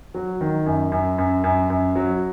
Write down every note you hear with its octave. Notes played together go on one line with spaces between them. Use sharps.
F#3
D#3
F#2
F#2
F#2
F#2
F#2
F#3